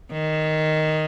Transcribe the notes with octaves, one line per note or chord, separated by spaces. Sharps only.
D#3